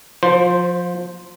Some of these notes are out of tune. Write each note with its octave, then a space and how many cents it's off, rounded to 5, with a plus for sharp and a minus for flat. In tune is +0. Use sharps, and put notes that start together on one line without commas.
F3 +25 C5 +0